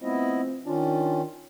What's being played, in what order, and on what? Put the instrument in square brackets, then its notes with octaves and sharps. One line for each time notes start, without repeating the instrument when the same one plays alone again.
[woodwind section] F3 A3 C4 [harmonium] B3 E4 D#5
[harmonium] D#3 C#4 [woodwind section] D4 F4